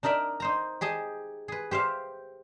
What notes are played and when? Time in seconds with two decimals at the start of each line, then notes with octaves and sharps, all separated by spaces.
0.03 D4 D#4 A#4 D5 E5
0.40 D#4 C5 A#5
0.81 G4 G#4 D#5 A5
1.48 G#4 B4
1.71 G4 C5 E5 F5